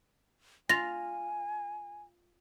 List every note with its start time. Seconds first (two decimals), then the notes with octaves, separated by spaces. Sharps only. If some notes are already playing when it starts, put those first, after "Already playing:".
0.69 F4 G#5 A#6 F7